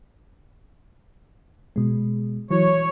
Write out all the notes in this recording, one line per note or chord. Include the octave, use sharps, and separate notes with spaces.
B2 G#3
E3 F#3 C#5